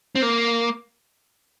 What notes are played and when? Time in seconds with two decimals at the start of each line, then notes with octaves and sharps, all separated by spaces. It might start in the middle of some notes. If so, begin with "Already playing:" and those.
0.15 C4
0.22 A#3